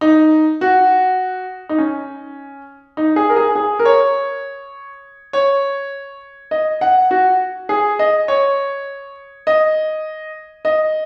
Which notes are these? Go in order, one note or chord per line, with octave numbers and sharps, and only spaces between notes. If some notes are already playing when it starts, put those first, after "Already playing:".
D#4
F#4
D#4
C#4
D#4
G#4
A#4
G#4
G#4
A#4
C#5
C#5
D#5
F#5
F#4
G#4
D#5
C#5
D#5
D#5